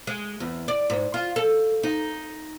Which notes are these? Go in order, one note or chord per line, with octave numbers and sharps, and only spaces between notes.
G#3
E2
D5
G#2
F4
A4
D#4